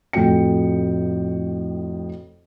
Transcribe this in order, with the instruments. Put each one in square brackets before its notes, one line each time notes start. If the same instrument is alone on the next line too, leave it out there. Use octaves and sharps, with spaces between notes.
[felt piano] F2 A2 F#4 G5 C#7